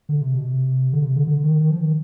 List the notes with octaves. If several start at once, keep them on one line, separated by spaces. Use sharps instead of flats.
D3
C3
B2
C3
D3
C3
D3
D3
D#3
D#3
F3
D#3